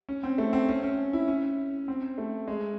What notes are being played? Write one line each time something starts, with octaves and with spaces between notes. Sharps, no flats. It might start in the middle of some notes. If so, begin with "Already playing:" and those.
C#4
C4
A3
C4
C#4
C#4
E4
C#4
C4
A3
G#3